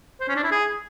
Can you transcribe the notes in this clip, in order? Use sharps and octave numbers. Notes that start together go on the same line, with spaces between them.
C5
C#4
D4
E4
G#4